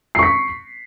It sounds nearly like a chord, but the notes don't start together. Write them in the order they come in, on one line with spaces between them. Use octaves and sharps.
C7 C#6 B6